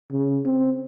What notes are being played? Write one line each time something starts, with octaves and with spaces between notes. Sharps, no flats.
C#3
C4